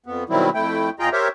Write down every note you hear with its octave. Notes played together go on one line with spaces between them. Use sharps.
F2 B3
B2 D#3 F#3 G3 C4 E4
F2 A3 E4 G5
E2 F4 G#4 D#5 G5 A#5
G4 A#4 C5 C#5 E5